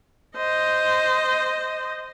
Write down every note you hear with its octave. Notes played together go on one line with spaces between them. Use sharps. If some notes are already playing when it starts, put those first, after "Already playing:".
C5 D#5